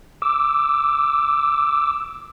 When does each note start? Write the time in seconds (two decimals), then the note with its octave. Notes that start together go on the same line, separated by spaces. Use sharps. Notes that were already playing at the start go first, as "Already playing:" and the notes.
0.22 D6 E6